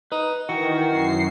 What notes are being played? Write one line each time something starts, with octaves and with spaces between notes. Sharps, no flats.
D#4 B4
D#3 E3 F#4 G5
F#2 C7